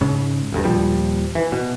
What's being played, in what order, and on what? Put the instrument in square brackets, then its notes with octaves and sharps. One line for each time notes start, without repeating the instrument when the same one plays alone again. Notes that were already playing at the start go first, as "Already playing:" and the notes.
[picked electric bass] G#2 C#3
E1 D2 G2
D#2 A#2 F3 G3
E3
B2